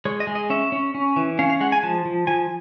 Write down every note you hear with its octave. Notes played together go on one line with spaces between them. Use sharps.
G#3 C#5
D#5
G#3
D#5
C#4 E5
C#4
C#4
E3
C#4 F5
F5
G#3 F#5
G#5
F3 A5
F3
F3 G#5